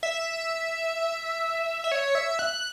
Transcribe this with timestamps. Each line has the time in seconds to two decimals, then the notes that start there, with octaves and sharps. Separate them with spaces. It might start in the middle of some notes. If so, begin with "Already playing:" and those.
0.03 E5
1.84 E5
1.92 C#5
2.15 E5
2.39 F#6